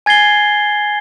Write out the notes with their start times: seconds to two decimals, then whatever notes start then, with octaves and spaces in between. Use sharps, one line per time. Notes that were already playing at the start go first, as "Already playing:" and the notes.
0.06 G#5 G#6 A6 C7 G7